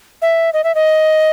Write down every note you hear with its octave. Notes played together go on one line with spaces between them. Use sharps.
E5
D#5
E5
D#5